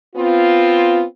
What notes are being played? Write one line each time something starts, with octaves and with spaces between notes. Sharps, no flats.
B3 C4 F4